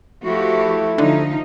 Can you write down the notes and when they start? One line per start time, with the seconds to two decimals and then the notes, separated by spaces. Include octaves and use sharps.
0.23 F3 A3 E4 F#4 G4
0.98 D3 F3 D#4